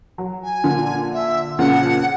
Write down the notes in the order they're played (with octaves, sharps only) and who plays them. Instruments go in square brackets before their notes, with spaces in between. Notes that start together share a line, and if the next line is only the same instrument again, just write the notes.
[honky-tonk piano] F#3
[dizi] G#5
[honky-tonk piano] A#2 D3 F3
[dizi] E5
[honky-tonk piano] F2 A#2 C#3 [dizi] F#5